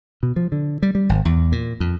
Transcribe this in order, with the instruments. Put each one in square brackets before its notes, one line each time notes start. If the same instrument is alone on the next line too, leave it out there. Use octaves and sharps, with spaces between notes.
[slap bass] B2
F3
D3
G3
G3
G#1
E2
A#2
F2